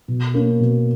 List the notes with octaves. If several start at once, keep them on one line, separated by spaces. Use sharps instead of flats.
B2
A#3 C#4
B2